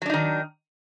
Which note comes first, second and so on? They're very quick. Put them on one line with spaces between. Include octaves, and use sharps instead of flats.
F#3 D4 D#4 D#3